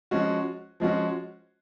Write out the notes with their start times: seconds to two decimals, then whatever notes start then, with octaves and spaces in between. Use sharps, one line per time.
0.11 F3 G#3 C#4 F#4
0.80 F3 G#3 C#4 F#4